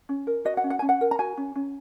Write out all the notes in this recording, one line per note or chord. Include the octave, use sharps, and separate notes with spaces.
C#4
A#4
F#4 D#5
F#5
C#4
F#5
C#4 G#5
F#5
A#4
A#5
F#4 G#5
C#4
C#4